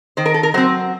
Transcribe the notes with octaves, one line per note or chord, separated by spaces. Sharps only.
D#3 C5
A#4
A4
A#4
F#3 C4 C5